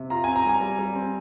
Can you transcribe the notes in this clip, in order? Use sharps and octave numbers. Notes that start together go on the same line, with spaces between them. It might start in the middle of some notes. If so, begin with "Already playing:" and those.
Already playing: C3
F4 A#5
C4 G#5
A#5
G3 G#5
G3
G3
C4